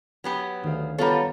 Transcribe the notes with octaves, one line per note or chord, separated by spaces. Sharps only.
F#3 B3 G4
D2 D#3 F5
G3 B3 F4 A4 C#5 A#5